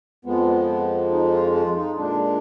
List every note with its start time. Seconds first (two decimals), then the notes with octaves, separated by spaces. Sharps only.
0.25 F2 F3 G#3 B3
1.11 D#4
1.25 D#4
1.32 F4
1.54 F4
1.76 D#4
1.97 A#2 G#3 D4